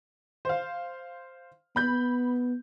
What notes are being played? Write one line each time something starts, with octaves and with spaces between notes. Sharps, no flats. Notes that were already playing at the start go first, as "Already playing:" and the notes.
C5 F5
B3 B5 G6